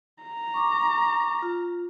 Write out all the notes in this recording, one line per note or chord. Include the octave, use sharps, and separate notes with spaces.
A#5
C#6 D6
F4